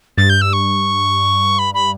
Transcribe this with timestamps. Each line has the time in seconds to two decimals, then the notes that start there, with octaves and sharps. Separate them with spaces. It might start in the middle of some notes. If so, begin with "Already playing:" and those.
0.18 G2 A6
0.30 G6
0.41 E6
0.53 C#6
1.59 B5
1.74 B5